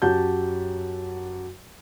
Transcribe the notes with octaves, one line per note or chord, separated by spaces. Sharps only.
F#2 F#4 G4 F#5 A5 G6